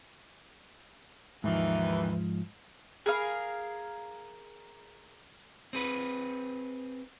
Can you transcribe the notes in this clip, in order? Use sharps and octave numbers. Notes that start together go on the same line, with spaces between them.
D#2 G#2 E3 F3
G#4 A#4 F5
C4 G#4 B4